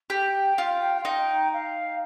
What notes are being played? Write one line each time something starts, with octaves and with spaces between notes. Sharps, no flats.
G4 G5
F4
F5
D#4 G5
F5